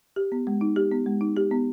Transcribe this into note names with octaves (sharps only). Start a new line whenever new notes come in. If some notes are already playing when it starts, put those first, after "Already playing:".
G4
B3
G#3
D#4
G4
B3
G#3
D#4
G4
B3